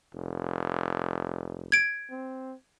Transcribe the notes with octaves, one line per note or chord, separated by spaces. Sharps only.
F1
G#6 D7
C4